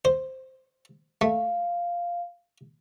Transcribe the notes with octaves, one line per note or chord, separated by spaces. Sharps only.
C5
A3 F5